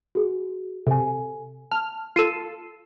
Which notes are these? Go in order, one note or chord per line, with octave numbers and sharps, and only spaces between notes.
F#4 G#4
C3 A4 G#5
A5 F6
F4 A4 C7 D#7 E7